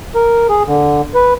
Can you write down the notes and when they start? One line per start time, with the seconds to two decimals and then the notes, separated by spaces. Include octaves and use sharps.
0.15 A#4
0.49 G#4
0.66 D3
1.15 B4